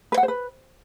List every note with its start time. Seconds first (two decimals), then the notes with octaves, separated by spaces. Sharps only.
0.12 B4
0.18 F#5
0.23 C5
0.28 B4